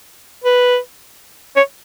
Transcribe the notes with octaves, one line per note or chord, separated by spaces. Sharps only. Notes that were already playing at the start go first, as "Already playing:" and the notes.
B4
C#5